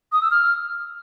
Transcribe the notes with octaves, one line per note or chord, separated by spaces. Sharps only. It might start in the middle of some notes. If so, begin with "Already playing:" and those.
D#6
E6
F6